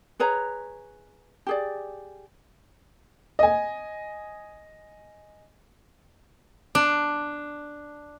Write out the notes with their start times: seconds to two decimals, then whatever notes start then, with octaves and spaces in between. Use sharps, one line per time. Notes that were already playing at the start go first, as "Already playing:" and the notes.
0.20 G#4 B4 C#5 A#5
1.47 G4 G#4 D5
3.39 D#5 G#5
6.75 D4